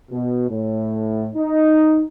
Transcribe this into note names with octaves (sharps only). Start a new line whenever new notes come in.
B2
A2
D#4